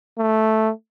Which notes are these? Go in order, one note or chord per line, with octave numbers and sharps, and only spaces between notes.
A3